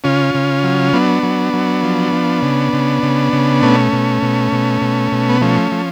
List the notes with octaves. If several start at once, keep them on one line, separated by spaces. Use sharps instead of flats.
C#3 C#4 F4
C#3
F#3
F#3 B3 D4
F#3
F#3
F3
F3
C#3
C#3
C#3
C#3
B2 A3 C#4
B2
B2
B2
B2
B2
B3
F3 A3 C#4
F3